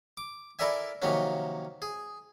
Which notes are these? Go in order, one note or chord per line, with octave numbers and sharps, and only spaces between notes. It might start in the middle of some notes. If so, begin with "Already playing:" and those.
D6
E4 A4 A#4 D5 E5 G#5
C3 D#3 F3 F#3 A#3 C#4
G#4